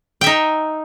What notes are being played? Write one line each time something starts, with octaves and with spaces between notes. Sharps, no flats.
D#4 E5 G5